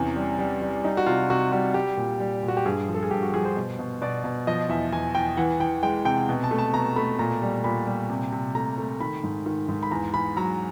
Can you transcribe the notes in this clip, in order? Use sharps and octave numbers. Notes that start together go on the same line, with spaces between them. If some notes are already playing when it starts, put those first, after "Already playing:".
Already playing: E2 C3 C#4
G3
G3
G3
G3 D#4
F#4
C3 F4
C3 F#4
G3 F#4
G3 G4
A#2
G3
A#2
F#4
G4
G2 G#4
F3
A4
G#4
G2 G4
F#4
F3 G#4
C5
B2
B2
B2 D5
B2
F3 D#5
E2 E5
E2 G#5
E2 G5
E3 F#5
E3 G5
G#3 G5
C3 G5
B2
A5
A3
A5
B2 A#5
A3 B5
A#2 A#5
G3
A#2 B5
G3
C3
C3
A3 A#5
A3
D#3 B5
G#2
D#3
G#2
B5
E2 A#5
E2 B5
F#3 A#5